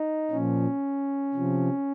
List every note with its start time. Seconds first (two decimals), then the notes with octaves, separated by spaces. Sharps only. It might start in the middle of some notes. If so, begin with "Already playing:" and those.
Already playing: D#4
0.31 A#2 F3 C#4
1.34 C3 F3